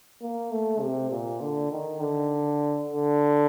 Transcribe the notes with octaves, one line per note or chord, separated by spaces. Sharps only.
A#3
A3
C3
A#2
D3
D#3
D3
D3